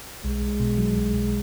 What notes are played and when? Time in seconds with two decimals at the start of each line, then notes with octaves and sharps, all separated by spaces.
0.24 B1 G#3
0.42 B1
0.60 B2
0.78 F#3
0.97 B1
1.14 B1